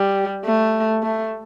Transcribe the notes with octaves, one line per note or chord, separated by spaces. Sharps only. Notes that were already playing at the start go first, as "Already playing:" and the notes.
Already playing: G3
A3
A3